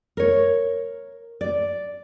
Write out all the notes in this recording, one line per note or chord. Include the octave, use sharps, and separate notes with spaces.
A#4 C#5
D5